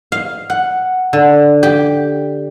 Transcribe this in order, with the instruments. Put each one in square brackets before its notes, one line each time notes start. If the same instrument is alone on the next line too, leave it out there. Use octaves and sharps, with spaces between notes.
[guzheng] F5
F#5
D3
G4